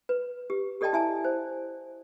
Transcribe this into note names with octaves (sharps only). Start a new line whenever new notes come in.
B4
G4
G4 A4 D5 D#5 G5 A5
E4 E5 G#5 A5
C5